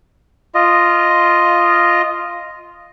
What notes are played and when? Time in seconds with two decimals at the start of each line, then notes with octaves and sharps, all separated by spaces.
0.55 F4 D#5